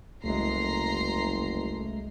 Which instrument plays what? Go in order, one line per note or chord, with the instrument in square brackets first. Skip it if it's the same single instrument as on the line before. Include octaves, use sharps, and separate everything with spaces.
[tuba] F#1 [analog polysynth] C2 G#3 [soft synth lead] A3 [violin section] A#5 C6 C7